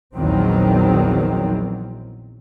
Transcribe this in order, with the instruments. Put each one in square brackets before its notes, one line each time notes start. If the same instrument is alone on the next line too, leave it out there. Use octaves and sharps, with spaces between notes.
[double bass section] A#1 E2 D#3 F#3 C4